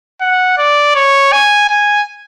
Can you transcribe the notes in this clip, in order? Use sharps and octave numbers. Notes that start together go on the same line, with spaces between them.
F#5
D5
C#5
G#5
G#5